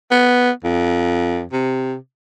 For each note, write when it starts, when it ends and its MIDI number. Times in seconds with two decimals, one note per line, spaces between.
0.11 0.50 59
0.64 1.44 41
1.52 1.95 48